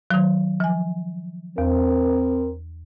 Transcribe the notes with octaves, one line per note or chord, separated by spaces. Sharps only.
D#3 F#3
F3 G#5
E2 C4 A#4